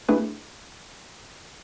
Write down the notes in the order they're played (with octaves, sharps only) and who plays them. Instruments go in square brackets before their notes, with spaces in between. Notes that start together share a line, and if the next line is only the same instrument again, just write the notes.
[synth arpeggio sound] A3 D4 E4 G4 G#4 B4